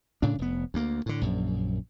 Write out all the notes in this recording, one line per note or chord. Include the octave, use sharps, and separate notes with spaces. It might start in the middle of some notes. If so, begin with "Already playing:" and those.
A2 C#3 D4
F1 B3
D2 A#3
A2 D3
A#1 F#2